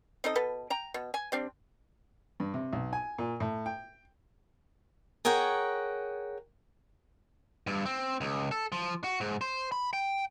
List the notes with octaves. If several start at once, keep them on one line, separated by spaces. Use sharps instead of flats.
C4 D#4 A4 D#5
B2 A4 B4
G5 A#5
B2
G#5
G3 C4 D4
G2
C3
B1
G#5
A#2
A2
G5
G#4 A#4 C#5 F#5 G5
G2
C4
C#2
A4
F3
F#4
G#2
C5
B5
G5